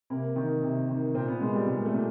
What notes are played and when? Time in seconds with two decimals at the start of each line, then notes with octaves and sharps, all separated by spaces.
0.10 C3 A#3
0.36 D#3
0.63 C3
0.89 D#3
1.14 A#2 C4
1.28 B3
1.41 A#2 G#3
1.54 G3
1.67 A#2 G#3
1.85 A3
1.94 A#2